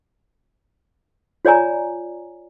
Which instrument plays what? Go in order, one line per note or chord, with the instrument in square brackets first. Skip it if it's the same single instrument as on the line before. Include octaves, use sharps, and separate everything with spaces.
[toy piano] F4 C#5 D5 G#5 A#5